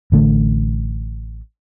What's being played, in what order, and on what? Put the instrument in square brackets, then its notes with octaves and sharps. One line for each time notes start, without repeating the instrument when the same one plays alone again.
[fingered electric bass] A1 D3 A3